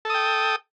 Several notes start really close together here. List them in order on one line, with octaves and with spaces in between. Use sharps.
A4 D#6 G5